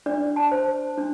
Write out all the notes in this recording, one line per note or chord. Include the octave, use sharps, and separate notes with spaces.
D4 D5
A5
C5
D4